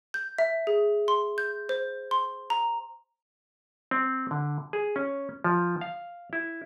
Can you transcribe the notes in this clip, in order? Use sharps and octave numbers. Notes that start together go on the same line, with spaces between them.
G6
E5
G#4
C6
G6
C5
C6
A#5
C4
D3
G#4
C#4
F3
F5
E4